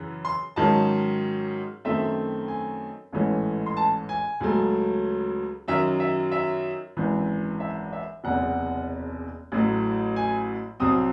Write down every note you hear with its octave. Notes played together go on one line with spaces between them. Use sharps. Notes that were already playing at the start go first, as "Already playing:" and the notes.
Already playing: F#2 C#3 E3
C6
G#2 D#3 F#3 C#4 A5
F#2 D#3 A3 C4 E5
G#5
A1 G#2 E3 A3 C#4
C6
A5
G#5
C#2 C#3 F#3 A3
F#2 D#3 F#3 E5
E5
E5
G#1 F#2 E3
E5
E5
F#1 E2 C3 F#5
A1 A2 F#3
G#5
C2 C3 F#3 C4 D#6